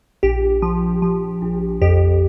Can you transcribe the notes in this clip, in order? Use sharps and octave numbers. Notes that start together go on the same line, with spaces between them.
A#1 G4
F3
F3
A#1
F2 G4